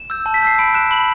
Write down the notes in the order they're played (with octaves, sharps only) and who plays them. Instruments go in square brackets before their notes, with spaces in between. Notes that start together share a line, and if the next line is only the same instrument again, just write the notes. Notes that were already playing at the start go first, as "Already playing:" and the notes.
Already playing: [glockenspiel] E7
E6 G6
A5
B6
E6 G6 C7
B5 D7
F#6 E7
B5 F#7